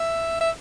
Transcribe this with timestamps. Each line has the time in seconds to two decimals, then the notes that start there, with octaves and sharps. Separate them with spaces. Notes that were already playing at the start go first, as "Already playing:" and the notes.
Already playing: E5
0.41 E5